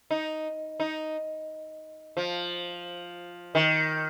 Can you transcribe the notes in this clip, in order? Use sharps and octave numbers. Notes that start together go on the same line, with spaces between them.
D#4
D#4
F3
D#3